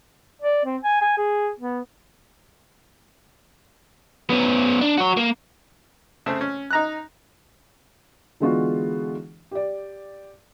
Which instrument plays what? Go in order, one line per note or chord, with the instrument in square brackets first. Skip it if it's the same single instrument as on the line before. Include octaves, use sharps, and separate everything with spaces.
[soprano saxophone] D5
C4
G#5
G#5
G#4
B3
[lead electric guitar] B3 C#4
D4
F#4 C#5
A#3
[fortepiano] C#3 A3 C4
C#4
D#4 A#5 F#6
[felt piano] D3 E3 G#3 B3 F4 F#4
G4 D5